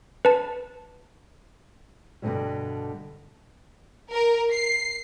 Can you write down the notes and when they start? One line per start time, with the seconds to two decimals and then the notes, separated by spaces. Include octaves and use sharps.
0.25 B4 A5
2.22 G2 B2 D3 D#3 F#3 G3
4.12 A#4
4.53 C7